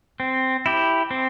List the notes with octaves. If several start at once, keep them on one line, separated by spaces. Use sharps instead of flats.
C4
E4 G4
C4